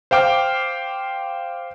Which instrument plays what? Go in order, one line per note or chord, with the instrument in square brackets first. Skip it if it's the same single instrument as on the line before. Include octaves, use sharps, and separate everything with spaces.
[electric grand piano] C5 F5 G5 D6 F6